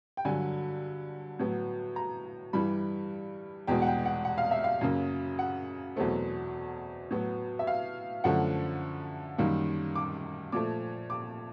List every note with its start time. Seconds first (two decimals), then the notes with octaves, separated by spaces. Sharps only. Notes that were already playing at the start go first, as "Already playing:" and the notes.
0.17 G5
0.25 G2 D3 F#3 G#5
1.39 A2 F#3 B3
1.96 A#5
2.53 G2 E3 G3 B5
3.67 E2 B2 G#3 G5
3.82 F#5
3.87 G5
4.06 F#5
4.25 F#5
4.38 F5
4.51 E5
4.64 F5
4.81 F#2 C#3 F#3 A#3
5.39 F#5
5.96 E2 B2 F#3 A3 C4
7.11 A2 F#3 B3
7.59 E5
7.67 F5
8.24 F#2 D3 F3 A3 F#5
9.38 F#2 D#3 G3 A#3
9.95 D6
10.52 A#2 F3 A3 D6
11.10 D6